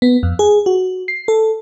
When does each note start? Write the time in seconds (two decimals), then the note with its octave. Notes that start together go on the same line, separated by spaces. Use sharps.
0.02 B3
0.23 F2
0.39 G#4
0.66 F#4
1.08 C7
1.28 A4